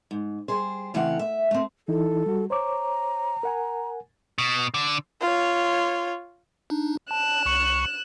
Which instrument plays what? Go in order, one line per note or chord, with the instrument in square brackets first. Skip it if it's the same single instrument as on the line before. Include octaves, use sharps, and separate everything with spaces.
[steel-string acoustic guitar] G#2
G3 G#4 C5
C#3 E3 A3 C4 F5 F#5
E5
A3 C4
[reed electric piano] E3 D#4 E4 [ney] A4
[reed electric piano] G3 F#4
[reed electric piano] C5 C#5 D6 [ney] A#5
[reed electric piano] A#4 F#5 G#5
[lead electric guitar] B2
D3
[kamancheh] F4 C#5
[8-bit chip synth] D4 D#4
[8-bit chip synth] A5 [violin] F#6 E7
[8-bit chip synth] C2 C#6 C#7